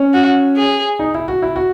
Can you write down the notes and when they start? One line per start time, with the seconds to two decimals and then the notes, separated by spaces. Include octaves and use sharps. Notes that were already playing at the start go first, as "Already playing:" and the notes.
Already playing: C#4
0.14 F#4
0.57 G#4
0.99 D#4
1.14 E4
1.28 F#4
1.42 E4
1.56 F#4